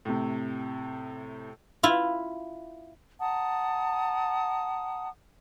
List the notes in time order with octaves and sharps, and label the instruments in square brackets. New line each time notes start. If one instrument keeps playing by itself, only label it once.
[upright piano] A2 C3
[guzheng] E4 F4
[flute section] F#5 A5 A#5 D#6